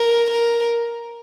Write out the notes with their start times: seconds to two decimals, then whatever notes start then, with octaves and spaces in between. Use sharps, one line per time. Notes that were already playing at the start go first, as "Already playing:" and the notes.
Already playing: A#4
0.31 A#4